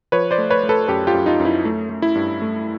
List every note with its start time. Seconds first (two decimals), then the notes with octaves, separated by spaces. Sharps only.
0.12 F3 B4 C#5
0.31 C5 D5
0.38 A3
0.50 B4 C#5
0.63 A3
0.69 A4 B4
0.88 F#2 G4 A4
1.07 F4 G4
1.14 F#2
1.26 D#4 F4
1.40 F#2
1.45 E4
1.65 A3
1.90 A3
2.02 E4
2.15 G2
2.42 A3